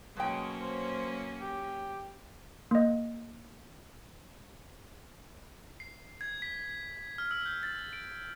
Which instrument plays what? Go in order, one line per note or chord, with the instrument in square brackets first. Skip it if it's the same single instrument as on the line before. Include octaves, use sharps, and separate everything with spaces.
[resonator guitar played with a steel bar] B2 G5 [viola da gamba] F#3 A#3 C#4 [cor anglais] G#3
[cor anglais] C5
G4
[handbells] A#3 D#5
[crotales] C7
G#6
B6
F6
E6
G6
A6
D7